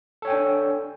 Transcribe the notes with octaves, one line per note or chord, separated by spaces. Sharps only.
D4 A4 C#5 G5 G#5